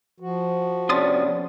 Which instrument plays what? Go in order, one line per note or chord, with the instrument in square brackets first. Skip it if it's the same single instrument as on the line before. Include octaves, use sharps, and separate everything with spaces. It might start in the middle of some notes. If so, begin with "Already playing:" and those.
[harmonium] F3 F#4
[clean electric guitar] C3 C#4 D4 [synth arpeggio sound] C6 D#6 A6